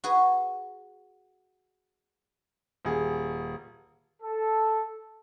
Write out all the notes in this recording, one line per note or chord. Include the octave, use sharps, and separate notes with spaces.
F#4 G#4 B4 G#5
D#1 G#4
A4